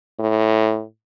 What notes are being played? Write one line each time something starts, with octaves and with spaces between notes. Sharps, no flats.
A2